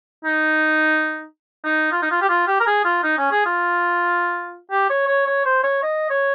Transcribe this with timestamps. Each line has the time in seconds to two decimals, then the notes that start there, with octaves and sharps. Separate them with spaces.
0.25 D#4
1.65 D#4
1.92 F4
2.02 D#4
2.11 F4
2.21 G4
2.29 F4
2.48 G4
2.60 A#4
2.67 G#4
2.85 F4
3.04 D#4
3.18 C#4
3.31 G#4
3.46 F4
4.71 G4
4.90 C#5
5.08 C#5
5.27 C#5
5.46 C5
5.63 C#5
5.83 D#5
6.10 C#5